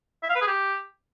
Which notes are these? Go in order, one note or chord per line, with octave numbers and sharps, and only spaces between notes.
E5
F5
B4
G#4
G4